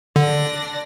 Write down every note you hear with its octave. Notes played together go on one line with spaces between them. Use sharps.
D3 D4 D5 A#6